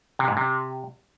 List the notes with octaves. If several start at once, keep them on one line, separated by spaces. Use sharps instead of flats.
C3
G#2
C3